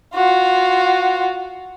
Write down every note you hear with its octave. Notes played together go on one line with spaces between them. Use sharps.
F4 F#4